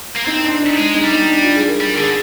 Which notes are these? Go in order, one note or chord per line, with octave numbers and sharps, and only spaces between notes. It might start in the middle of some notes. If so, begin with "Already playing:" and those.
A#3
C4 D#4
D4
D#4
G#3
D#4
G3
D#4
D4
F4
G#4
A#4
G3
D3 G#4